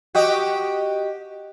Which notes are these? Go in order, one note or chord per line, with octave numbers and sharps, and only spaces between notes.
F#4 G4 D#5